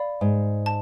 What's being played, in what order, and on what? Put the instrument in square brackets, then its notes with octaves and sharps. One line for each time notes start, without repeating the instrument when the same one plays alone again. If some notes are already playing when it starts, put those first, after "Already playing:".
Already playing: [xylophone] D5 F5 B5
[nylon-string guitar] G#2
[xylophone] A5